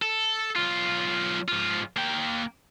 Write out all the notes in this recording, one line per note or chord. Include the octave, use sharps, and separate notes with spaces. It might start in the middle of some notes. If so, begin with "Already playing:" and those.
A4
B1 F4
G#2 F4
A#3 G5